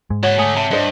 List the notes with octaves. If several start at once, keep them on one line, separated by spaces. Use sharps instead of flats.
G#2 G#3
F#4 C#5 F#5 A5
D3 A3 G#5 D#6
C3 E5 A5
G2 D4 C5 D#5